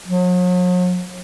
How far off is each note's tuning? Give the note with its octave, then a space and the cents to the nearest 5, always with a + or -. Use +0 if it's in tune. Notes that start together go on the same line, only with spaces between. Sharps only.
F#3 -45